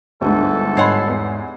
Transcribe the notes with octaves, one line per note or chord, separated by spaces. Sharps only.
G1 D2 G#2 A4
G#2 C#5 F#5 B5 C6 C7
E2